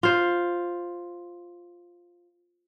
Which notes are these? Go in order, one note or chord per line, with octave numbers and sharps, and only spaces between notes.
F4 C5